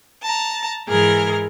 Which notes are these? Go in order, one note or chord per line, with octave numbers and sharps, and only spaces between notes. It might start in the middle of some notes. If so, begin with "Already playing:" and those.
A5 A#5
G#2 E3 G#4 A#4 F6